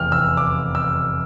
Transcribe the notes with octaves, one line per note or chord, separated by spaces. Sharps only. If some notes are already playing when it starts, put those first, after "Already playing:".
Already playing: F1 E2 E3 G5 F6
E6
D6
E6